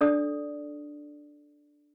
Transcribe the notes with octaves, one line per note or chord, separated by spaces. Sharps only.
D4 A4 D5 D#6